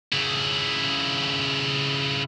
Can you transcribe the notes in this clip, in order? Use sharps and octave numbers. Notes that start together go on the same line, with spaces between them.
C#3 E4